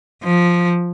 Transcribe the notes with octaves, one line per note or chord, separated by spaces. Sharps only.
F3